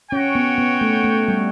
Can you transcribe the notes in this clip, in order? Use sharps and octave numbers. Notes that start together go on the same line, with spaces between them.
C#4 F#4 C#5 G5
B3
B3
A3
A3
G3